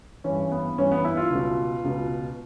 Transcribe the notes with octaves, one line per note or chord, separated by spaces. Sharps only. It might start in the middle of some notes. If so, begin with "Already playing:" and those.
G2 E3 C#4
B3
G2 E3 C#4
B3
E4
F4
C#2
B2
C#2 B2